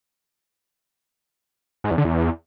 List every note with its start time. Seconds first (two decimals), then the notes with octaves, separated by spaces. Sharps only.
1.84 G#2
1.91 E2
1.98 D3
2.05 E2